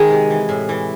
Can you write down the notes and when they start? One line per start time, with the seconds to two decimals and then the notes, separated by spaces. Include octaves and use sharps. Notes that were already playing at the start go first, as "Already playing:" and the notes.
Already playing: D#3 G#3 G#4
0.10 C3
0.30 E3
0.49 A2
0.69 E3